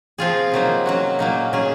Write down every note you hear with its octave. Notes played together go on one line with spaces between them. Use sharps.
F3 C4 F4 G#4
C3 F#3 A#3 D#4
F#3 C#4 F#4
A#2 F#3 A#3 D#4
F#3 C#4 G#4